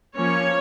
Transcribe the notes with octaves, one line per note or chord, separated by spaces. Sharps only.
F3 A#3 C#4 C#5